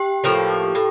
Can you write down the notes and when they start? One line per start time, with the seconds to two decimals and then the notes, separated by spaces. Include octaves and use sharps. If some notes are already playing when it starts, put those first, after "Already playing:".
Already playing: G4 G5
0.24 A2 F3 A#3
0.75 A2